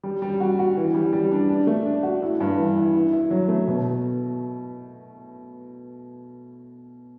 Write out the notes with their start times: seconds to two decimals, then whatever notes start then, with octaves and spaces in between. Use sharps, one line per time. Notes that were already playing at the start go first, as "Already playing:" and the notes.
0.03 G3
0.22 G3
0.40 F#4
0.59 F#4
0.77 E3
0.94 G3
1.13 G3
1.31 D4
1.49 D4
1.67 A3
1.85 D4
2.03 F#4
2.22 E4
2.40 G2
2.57 E3
2.77 E4
2.94 E4
3.12 E4
3.31 F#3
3.48 A3
3.67 B2